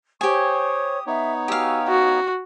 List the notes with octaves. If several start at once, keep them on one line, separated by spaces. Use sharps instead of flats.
G4 C5 C#5 G#5 C#6 D#6
B3 D#4 C#5 E5
F#4 G4 F5 G#5 E6
C#4 F#4